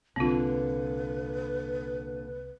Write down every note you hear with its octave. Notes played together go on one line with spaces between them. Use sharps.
C2 A#2 D3 C4 F4 B4